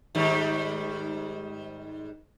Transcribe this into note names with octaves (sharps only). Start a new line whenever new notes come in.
G#2 D#3 G3